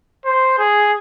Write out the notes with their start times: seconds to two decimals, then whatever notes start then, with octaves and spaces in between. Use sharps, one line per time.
0.25 C5
0.58 G#4